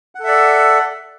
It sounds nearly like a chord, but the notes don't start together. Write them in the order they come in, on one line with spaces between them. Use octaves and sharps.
F#5 A4 E5 D5